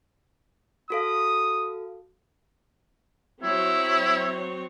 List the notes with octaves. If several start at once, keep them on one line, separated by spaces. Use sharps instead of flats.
F#4 A4 F5 D#6
F#3 C4 E4 C#5